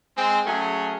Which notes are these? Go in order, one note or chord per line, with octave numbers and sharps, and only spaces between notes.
G#3 C4
F#3 A3 C#4 G#4